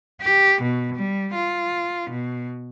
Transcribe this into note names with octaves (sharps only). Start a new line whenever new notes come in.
G4
B2
G3
F4
B2